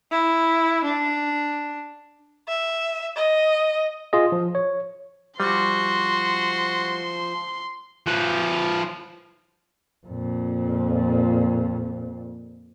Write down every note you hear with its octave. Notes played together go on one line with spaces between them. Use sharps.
E4
D4
E5
D#5
F4 G#4 D#5
F3
C#5
F3 G3 F#4 C5 C6
F3 B4
F2 A#2